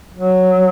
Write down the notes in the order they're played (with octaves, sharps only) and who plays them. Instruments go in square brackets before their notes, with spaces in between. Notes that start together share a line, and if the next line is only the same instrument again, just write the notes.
[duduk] F#3